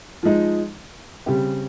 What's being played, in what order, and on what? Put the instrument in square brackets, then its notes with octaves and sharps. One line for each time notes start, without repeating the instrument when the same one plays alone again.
[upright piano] F3 G#3 D#4
C#3 G3 C4 G4